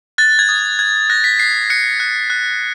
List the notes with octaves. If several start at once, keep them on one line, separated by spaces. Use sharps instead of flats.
F#6 A6
G#6
D#6
F#6 G#6
F#6 A#6
B6
F#6 C7
F#6 C#7
F#6
F#6